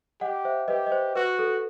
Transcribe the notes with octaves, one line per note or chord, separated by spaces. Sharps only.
G4 D#5 F#5
C5 E5
G4 B4 D#5
D#5
C5
F#4 B4
A4